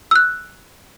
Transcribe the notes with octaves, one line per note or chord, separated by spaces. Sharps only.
E6 F#6